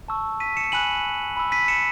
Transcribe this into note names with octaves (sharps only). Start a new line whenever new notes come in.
A5 C#6 E6
B6 D#7
C#7 E7
G#5 B5 F#6 D#7 F#7
B5 E6
B6 D#7
C#7 E7